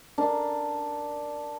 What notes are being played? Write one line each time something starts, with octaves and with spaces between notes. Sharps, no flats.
D4 A#4